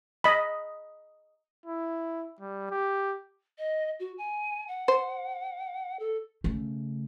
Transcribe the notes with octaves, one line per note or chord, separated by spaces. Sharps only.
D#5 B5
E4
G3
G4
D#5
F#4
G#5
F#5
C5
A4
C#3 A3